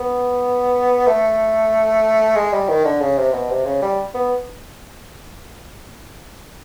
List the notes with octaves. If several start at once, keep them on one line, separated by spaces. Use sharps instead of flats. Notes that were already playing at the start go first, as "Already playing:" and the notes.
Already playing: B3
A3
G#3
G3
D#3
D3
C#3
C3
B2
C3
C#3
G3
B3